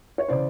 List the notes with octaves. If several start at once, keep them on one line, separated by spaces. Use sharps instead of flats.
C#5
C#3 E3 C5 D5